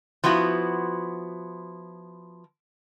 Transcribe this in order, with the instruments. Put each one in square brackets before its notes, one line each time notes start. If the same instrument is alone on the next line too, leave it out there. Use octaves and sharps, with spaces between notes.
[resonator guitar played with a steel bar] F3 B3 E4 F#4